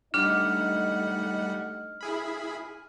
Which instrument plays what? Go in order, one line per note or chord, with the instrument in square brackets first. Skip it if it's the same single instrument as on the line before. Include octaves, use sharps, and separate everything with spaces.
[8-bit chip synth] G3 F#5 [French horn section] A3 D#4 D#5 [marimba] D4 [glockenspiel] F6
[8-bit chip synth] E4 G#4 B5